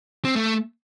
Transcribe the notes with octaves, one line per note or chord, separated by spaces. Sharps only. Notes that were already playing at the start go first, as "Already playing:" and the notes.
C4
A3